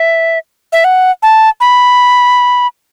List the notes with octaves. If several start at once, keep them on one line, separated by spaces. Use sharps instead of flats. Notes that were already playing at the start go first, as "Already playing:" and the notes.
Already playing: E5
E5
F#5
A5
B5